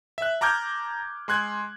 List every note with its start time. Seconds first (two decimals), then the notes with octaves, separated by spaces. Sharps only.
0.18 E5 F#6
0.41 A5 A#5 D6 F6 G6 G#6
1.28 G#3 C6 F#6 G#6